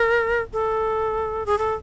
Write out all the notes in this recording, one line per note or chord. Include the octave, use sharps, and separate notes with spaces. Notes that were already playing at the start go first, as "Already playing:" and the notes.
Already playing: A#4
A4
G#4
A4